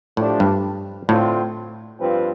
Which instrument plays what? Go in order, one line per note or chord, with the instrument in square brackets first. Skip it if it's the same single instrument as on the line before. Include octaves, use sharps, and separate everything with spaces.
[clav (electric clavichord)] A2 [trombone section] F3 A3 D4 G4
[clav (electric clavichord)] G2
[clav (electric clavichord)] A2 [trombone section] D3 A3 C4 F4
[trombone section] G2 F3 C4 F4 B4